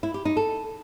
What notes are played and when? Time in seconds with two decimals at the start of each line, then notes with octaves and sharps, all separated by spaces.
0.03 E4
0.14 G4
0.25 D#4
0.37 A4